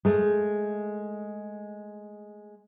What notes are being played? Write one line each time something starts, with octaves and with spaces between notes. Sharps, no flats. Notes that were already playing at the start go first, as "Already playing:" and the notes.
G#3 A3